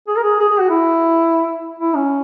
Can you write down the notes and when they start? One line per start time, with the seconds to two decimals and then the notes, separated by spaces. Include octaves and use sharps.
0.08 G#4
0.16 A#4
0.23 G#4
0.39 G#4
0.49 G#4
0.59 F#4
0.70 E4
1.79 E4
1.95 C#4